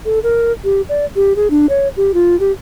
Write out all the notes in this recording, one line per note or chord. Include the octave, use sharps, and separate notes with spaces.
A4
A#4
G4
D5
G4
G#4
D4
C#5
G4
F4
G4